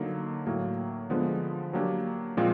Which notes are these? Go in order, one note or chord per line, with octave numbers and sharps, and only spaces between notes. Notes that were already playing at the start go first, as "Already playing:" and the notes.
Already playing: D3 F#3 A#3 D#4
A2 F#3 A#3
D3 F3 G#3 B3
F#3 A#3 D4 G4
A#2 F3 G#3 C4 F4